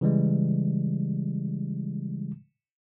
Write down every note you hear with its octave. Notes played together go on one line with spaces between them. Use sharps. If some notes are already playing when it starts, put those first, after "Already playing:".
C#3 E3 G3 G#3